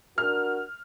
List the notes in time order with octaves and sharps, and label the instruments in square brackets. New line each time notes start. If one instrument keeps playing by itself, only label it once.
[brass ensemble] D4 F#4 A#4 [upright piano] F6